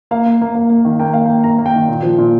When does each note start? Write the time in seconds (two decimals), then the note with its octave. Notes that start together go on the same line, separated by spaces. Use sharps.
0.11 A#3 F5
0.26 A#3
0.41 A#3
0.55 A#3
0.70 A#3
0.85 D#3
1.00 A#3 G5
1.13 A#3 F5
1.26 A#3 G5
1.44 A#3 A#5
1.58 A#3
1.66 G5
1.74 D#3
1.88 A#2
2.03 F3
2.18 A#2